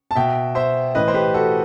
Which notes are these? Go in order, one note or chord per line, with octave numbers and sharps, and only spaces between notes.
A5
B2 E5 G5
C5 E5
A2 E3 B4 D#5
C5
G4 B4
F#4 A4